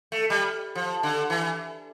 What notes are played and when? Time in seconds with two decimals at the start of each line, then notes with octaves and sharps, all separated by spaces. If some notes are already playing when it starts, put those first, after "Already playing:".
0.12 A3
0.30 G3
0.75 F3
1.03 D3
1.30 E3